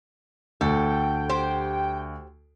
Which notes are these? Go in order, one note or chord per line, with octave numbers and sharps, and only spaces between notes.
D2 A4 G5
G4 C5